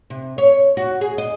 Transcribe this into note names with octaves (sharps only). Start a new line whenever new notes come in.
C3
C#5
F#4
G#4
D#5